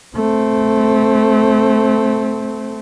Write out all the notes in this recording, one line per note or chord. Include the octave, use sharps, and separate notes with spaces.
A3 C4